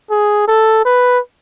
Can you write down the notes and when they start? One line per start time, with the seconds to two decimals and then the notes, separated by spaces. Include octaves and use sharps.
0.11 G#4
0.48 A4
0.85 B4